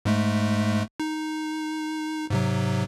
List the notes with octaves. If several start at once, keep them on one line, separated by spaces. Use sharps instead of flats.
G#2 G#3 A3
D#4
G#2 C3 F#3